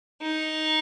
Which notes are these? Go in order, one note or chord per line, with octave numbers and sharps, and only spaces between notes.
D#4